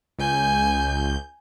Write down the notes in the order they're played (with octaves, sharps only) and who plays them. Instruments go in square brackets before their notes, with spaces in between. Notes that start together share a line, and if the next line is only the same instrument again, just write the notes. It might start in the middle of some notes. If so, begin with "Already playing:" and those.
[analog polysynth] C#2 G6 [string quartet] G#5